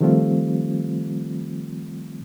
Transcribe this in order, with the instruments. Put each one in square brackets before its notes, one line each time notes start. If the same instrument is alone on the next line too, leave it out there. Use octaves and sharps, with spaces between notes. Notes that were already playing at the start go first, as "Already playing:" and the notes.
[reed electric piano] D#3 F3 G3 A3 C4 F4